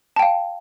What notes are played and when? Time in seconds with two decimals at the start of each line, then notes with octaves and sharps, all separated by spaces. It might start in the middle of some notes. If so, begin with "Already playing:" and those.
0.16 A5
0.19 G5
0.22 F5